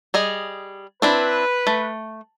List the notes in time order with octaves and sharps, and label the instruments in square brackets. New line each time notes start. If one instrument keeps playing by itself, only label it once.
[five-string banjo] G3 G#4 D#5
[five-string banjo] C4 D4 E4 [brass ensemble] B4
[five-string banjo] A3